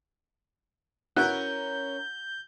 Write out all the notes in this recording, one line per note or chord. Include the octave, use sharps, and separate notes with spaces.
C#4 E4 F#4 A#4 B4 F#6 G6